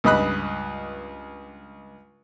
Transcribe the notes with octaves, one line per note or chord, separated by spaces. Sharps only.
C#2 G2 D#5 B5 F#6